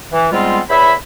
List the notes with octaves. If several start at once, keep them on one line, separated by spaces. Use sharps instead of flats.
E3
G#2 G3 G#3 B3 C4 F4
E2 C#5 E5 B5